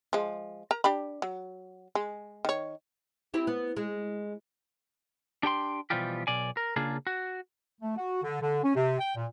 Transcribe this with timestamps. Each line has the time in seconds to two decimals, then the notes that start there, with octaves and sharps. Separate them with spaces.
0.13 F3 G#3
0.71 A#4 A#5
0.84 D4 G4 B5
1.22 F#3
1.95 G#3
2.45 D#3 C#5
3.34 C4 E4 G4
3.47 B3
3.77 G#3
5.43 D4 G4 G5 C6
5.90 B2 E3 F3 G3 F4 G4
6.27 B1 B2 D5 G#5
6.57 A#4
6.76 C#3 A#3 D4 F4 G#4
7.07 F#4
7.81 A3
7.97 F#4
8.23 D3
8.41 D3
8.63 C#4
8.75 C3
8.99 G5
9.16 A#2